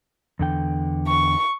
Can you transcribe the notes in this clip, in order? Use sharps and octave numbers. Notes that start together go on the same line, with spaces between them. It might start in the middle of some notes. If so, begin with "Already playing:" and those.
E2 D3 G5
C#6